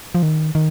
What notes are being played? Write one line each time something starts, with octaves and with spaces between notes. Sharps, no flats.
F3
D#3
D#3